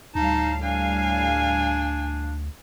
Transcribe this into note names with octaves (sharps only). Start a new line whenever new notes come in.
D2 A2 G3 D#4 F5 A5
D4 G#5